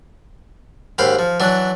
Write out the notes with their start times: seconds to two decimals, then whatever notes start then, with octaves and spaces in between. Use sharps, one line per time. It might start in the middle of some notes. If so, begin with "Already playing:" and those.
0.98 D#2 G#2 F5 G5 B5
1.19 F3
1.40 E3 F#3 D4